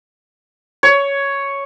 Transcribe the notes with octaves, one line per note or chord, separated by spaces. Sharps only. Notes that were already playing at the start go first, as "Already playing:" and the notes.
C#5